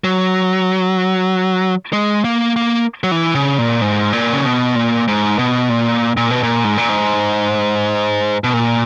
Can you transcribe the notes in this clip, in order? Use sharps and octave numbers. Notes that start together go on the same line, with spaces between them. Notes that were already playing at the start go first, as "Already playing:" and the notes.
F#3
G#3
A#3
A#3
F#3
E3
C#3
A#2
G#2
A#2
C#3
B2
A#2
G#2
B2
A#2
A#2
B2
A#2
G#2
A#2
G#2
B2
A#2